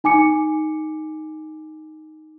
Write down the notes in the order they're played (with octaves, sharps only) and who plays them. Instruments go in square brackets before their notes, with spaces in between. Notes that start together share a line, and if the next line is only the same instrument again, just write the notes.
[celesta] D#4 G#5 D6 C#7